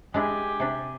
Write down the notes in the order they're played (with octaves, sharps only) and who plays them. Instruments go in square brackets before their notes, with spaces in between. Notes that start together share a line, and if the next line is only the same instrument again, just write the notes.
[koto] G#3 D4 E4 [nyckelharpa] G4 G#5
[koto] C3 D4